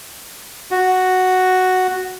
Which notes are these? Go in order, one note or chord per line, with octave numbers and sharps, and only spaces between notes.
F#4